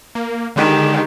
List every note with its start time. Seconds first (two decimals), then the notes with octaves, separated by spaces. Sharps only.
0.15 A#3
0.56 D3 D#3 G#3 G4